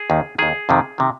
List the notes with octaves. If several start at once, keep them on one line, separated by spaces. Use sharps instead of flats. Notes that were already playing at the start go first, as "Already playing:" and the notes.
Already playing: G#4
D#2 D#3
D#2 D#3 G#4
F2 C3 D#3
C3 D#3